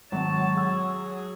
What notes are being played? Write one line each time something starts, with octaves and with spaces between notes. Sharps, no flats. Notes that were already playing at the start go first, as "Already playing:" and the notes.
G#1 F#3 C#5 A5
G#4 F#5 E6